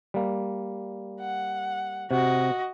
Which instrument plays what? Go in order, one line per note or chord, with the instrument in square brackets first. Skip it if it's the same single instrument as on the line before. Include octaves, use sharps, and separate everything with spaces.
[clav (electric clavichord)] G3 A#3
[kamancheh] F#5
[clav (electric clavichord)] C3 [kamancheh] F#4 D#5